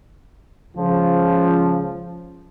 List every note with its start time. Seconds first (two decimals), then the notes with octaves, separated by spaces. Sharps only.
0.76 C#2 C#3 F3